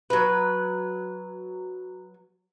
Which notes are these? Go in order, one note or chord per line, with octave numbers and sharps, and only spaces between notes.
F#3 B4